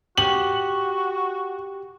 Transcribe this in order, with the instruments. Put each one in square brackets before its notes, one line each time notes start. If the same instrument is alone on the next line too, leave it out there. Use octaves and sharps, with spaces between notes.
[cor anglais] F#4 [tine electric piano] G4 [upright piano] F#7